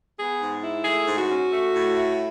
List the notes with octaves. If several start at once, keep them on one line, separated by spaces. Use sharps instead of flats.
B3 G#4
G#2
E4
A3 G#4
G#2
F#4
C#4
A3
A2
E4